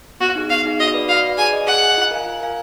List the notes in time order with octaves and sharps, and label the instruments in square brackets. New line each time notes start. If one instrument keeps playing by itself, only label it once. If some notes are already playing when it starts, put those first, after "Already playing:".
[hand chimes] B3 [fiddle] F#4
[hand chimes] D#4 G#4
[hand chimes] B3 [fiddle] F5
[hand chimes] D#4 G#4
[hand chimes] F#4 [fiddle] D#5
[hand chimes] B4 D5
[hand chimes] F#4 [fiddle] F5
[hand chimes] B4 D5
[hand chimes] G#4 [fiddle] G#5
[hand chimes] D#5 G#5
[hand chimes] G#4 [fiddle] F#5
[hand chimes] D#5 G#5
F4
A#4 F5 G#5
F4
A#4 F5 G#5